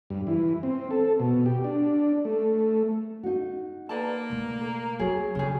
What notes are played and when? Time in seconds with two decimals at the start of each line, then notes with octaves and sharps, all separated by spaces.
0.10 G2
0.27 E3
0.63 C4
0.91 A4
1.20 B2
1.46 G4
1.64 D4
2.25 A3
3.23 D#4 F#4
3.89 A#3 B4 D5 A5
4.30 B2 A3
4.61 A#4
4.99 F#3 C4 G#4
5.35 C#3 G3 C#4 G#4